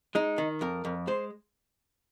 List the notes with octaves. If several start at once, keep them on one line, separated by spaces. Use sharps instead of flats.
G#3 D#4
D#3
F2 A#4
F2
G#3 C5